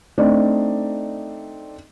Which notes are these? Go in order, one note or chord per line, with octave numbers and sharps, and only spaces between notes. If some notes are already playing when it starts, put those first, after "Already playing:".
A3 C4 D4 D#4 D5 D#5